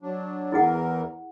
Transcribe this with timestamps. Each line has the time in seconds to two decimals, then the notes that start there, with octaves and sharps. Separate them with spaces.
0.02 F#3 D4
0.52 E2 E3 E4 G#4 A#4 F#5